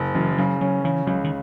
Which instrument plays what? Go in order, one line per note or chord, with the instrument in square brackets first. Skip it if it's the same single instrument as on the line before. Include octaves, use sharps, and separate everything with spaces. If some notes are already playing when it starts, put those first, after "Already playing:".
Already playing: [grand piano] F#1
[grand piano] F#2 [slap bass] E3
[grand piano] C#3 [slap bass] F#3
[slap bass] F#3 [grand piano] C#4
[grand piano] C#3 [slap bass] E3
[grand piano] C#2 [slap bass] F#3
[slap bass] D#3